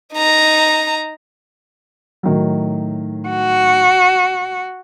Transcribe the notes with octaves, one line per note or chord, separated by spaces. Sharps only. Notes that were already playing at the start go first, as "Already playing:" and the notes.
D#4 A#5
A2 D#3 F#3
F#4